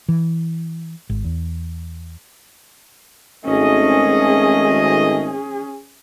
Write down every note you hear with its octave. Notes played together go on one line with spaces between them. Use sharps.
E3
G#1
E2
G#1 A3 C#4 G#4 D#5